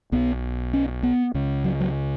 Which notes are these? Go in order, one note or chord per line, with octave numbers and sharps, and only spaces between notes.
B1 B2 B3
C#4
B3
C#2 C#3
F#3
F#3